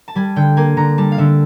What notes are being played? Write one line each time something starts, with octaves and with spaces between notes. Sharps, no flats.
A5
G3 G#5
D3 G5
A#3 G#5
D3 A#5
G3 A5
F5
D3 E5